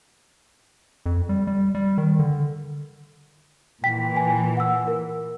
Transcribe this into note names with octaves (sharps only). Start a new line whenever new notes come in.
F2
G3
G3
G3
D#3
D3
A#2 E3 G5 B6
G#5
F#5 E6
A#4